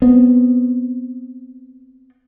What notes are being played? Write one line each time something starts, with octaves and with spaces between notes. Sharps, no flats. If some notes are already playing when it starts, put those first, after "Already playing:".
B3 C4